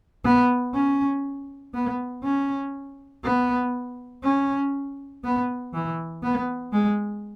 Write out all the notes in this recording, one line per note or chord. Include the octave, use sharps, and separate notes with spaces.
B3
C#4
B3
C#4
B3
C#4
B3
E3
B3
G#3